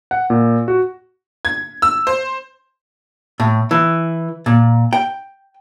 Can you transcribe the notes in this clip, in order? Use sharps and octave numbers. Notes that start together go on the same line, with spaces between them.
F#5
A#2
F#4
G#6
E6
C5
A2
E3
A#2
G5